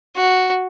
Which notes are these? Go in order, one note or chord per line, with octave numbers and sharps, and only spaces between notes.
F#4